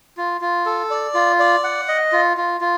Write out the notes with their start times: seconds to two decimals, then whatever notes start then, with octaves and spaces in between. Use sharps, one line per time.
0.17 F4
0.41 F4
0.66 A4
0.90 D5
1.14 F4
1.39 D5
1.64 F#5
1.88 D#5
2.12 F4
2.37 F4
2.61 F4